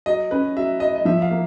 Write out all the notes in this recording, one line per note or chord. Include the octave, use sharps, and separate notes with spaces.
F#3 D#5
C#4 B4
F#3 E5
F#3 D#5
D#5
F3 E5
F5
A#3